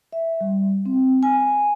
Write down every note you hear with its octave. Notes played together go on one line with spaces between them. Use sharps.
E5
G3
C4
G#5